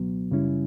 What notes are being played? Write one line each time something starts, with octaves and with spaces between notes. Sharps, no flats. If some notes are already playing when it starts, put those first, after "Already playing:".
Already playing: C#2 B2 F#3 B3
F#2 C#3 G3 C#4 E4